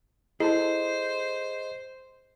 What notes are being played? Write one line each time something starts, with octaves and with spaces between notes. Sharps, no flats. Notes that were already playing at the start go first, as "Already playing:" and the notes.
E4 G#4 A4 C5 D#5 A5